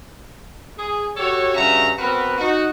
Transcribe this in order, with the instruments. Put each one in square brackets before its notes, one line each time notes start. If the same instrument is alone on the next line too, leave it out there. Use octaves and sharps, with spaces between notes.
[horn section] G#4
F#4 G4 A4 C#5
G2 C#3 F#4 E5 A#5
B3 C4 F#4 A#4 B4
D#4 F#4